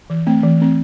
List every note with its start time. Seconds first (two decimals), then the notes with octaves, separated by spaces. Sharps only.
0.10 E3
0.27 A3 C4
0.43 E3
0.60 A3 C4